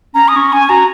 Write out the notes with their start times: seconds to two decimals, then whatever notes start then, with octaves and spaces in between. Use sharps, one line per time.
0.15 C#4 A#5
0.28 D#6
0.36 C#4 C#6
0.53 C#4 G#5
0.69 F#4 A#5